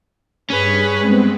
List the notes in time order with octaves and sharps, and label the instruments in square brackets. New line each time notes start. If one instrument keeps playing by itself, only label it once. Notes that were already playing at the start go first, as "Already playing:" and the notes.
[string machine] G2 [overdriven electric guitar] C#4 [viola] G#4 B4
[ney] G#3 [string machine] B3 C4